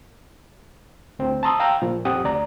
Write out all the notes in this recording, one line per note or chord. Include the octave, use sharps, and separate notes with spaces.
D2 C4
A5 A#5 C6 D#6 E6
F5 G5 A#5 E6
A#2 F3
F2 C4 G4 F#5 D#6
D2 D5 A#5